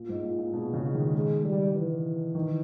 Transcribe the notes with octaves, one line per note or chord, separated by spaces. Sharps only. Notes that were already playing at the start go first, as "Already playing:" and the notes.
Already playing: A#2
G#2
A#2
A#2
B2 G#3
C#3
D#3
G#3
G3
E3
D#3